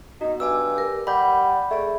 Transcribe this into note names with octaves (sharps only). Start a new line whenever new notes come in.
B3 D#4 F#4
G2 G#5 D6 E6
G4 A#4
G3 F#5 B5 G6
A3 G#4 D5